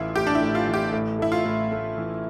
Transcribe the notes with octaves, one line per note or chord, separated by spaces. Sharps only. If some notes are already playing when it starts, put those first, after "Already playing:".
Already playing: A1 E3 A3 E4 F4
A3 G4
D4
E4
A2
F4
E3
G4
A2
A3 E4
F4
A2
A3
E3